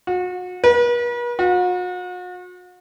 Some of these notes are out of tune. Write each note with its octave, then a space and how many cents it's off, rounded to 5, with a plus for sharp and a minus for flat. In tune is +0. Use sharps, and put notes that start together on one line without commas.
F#4 -35
B4 -45
F#4 -40